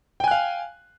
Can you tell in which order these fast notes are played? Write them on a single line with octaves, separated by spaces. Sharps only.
G5 G#5 F#6 F5